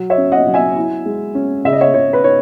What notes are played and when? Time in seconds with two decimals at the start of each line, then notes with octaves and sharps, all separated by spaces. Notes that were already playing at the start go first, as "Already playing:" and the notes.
Already playing: F#3
0.10 C#5 E5
0.18 C#4
0.32 D#5 F#5
0.46 F#3
0.54 E5 G#5
0.76 E4
1.06 G#3
1.35 C#4
1.65 C#3 E5
1.73 D#5
1.81 C#5 E5
1.94 C#3 C#5
2.13 B4
2.24 D#4 C#5